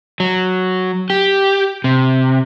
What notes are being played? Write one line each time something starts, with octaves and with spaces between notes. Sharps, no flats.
F#3
G4
C3